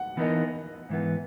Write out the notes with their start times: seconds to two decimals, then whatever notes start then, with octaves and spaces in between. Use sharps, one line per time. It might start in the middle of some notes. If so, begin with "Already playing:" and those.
Already playing: F#5
0.17 E3 B3 D#4 A#4 D#5
0.89 G#2 E3 B3